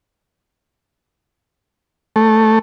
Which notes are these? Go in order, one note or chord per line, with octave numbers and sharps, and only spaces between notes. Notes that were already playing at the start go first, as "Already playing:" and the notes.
A3